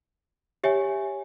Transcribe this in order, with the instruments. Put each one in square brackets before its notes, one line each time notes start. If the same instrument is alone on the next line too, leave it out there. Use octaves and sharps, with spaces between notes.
[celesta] G4 C#5 E5 G#5